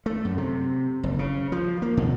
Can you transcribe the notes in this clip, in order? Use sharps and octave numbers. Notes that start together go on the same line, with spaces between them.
A3
F#2
C3
F#1
C#3
F3
A#3
B2